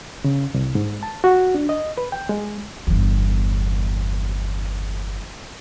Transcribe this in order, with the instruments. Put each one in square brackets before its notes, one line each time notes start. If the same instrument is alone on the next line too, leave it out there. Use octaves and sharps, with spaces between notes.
[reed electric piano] C#3
C2
G#2
A5
F#4
D4
D#5
B4
G5
G#3
[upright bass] G1 E2